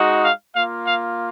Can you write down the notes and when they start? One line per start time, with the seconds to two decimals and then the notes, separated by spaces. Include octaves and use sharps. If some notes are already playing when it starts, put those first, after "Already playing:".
Already playing: G#3 D#4 F#4
0.23 F5
0.54 A#3 F4 F5
0.85 F5